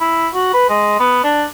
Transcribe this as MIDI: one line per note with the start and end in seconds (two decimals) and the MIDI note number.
0.01 0.28 64
0.34 0.53 66
0.54 0.65 71
0.69 0.96 56
1.00 1.23 59
1.23 1.45 62